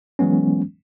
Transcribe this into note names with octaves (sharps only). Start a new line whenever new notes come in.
E3 F#3 G#3 B3 C#4